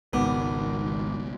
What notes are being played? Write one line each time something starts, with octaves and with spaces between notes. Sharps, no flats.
G#1 C#2 B2 D#3 B3 D6